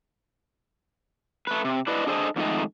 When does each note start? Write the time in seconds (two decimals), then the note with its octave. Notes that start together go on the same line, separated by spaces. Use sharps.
1.47 A3 B4
1.65 C3
1.87 D4 E4 B4 D5 D#5
2.07 D4 G#4 A4 C5 D5 D#5
2.36 F2 G#2 D#3 A3 D#5